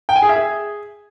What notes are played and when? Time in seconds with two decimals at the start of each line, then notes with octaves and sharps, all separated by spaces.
0.09 G5
0.16 G#5
0.22 G#4
0.29 E5
0.36 G#4